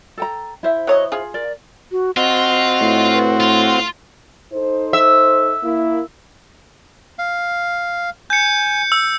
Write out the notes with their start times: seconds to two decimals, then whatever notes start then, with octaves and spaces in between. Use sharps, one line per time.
0.17 A4 G5 A#5
0.63 E4 C5 E5
0.87 F#3 C#5 D#5
1.12 F4 G#4
1.34 A#4 D5
1.92 F#4
2.17 C4 F4 F#4 D#5
2.81 A2
3.12 B4
3.40 F4 C6
4.53 D#4 A4 C5
4.93 E5
5.63 A#3 E4
7.19 F5
8.30 G#5 G6 C#7
8.92 E6